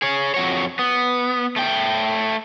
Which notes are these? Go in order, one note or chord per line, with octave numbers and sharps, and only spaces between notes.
G#4 C#5
F2 F#4 C#5
B3
A3 G5